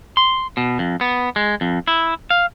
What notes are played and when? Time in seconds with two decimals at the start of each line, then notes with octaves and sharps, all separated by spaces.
0.17 C6
0.57 B2
0.79 F2
1.01 B3
1.36 G#3
1.61 F2
1.88 E4
2.30 F5